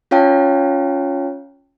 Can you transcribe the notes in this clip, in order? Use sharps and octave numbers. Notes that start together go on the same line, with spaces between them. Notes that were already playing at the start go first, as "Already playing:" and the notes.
C#4 F4 C#5 F5 G5 A5